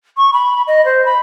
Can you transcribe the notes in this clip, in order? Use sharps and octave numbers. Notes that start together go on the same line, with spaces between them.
C#6
B5
D#5
C5
B5